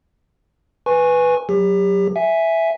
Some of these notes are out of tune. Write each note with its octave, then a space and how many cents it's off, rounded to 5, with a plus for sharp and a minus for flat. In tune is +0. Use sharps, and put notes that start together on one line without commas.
B4 +0 G#5 +0 C#6 -20
F#3 +5 G4 +30
E5 +0 G#5 +0